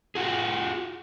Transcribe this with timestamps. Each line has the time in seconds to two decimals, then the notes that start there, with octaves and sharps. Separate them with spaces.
0.15 F4 F#4 G#4